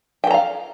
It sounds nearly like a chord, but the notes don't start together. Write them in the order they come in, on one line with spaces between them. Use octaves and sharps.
G5 A4 A#5 F5